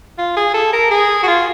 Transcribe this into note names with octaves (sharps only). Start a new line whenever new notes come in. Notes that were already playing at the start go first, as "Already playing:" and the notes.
F4
G#4
A4
A#4
G#4
F#4
F4